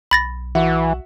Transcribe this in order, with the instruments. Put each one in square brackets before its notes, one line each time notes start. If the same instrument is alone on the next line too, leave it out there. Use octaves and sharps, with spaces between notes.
[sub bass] B1 [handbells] B5 A6 A#6
[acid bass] E3 [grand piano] F#4 E5 F#5